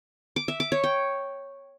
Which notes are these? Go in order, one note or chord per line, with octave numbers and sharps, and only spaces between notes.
D6
E5
D6
C#5
G5